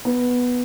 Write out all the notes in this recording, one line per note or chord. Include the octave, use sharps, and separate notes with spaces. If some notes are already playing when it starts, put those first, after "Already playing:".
B3